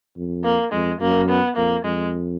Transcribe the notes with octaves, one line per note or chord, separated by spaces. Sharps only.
F2
A#3
F2 G#3
F#2 A#3
B3
F2 A#3
F2 G#3